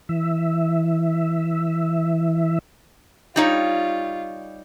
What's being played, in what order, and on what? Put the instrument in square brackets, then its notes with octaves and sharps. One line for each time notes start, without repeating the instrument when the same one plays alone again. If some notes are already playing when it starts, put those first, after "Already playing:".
[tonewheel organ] E3 E5
[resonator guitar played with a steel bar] G3 D#4 C#5 [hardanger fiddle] F4